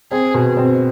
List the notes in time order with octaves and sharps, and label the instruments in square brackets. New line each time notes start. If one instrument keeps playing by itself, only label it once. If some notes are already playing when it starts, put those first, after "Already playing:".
[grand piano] C4 [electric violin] G#4
[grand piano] B2
C4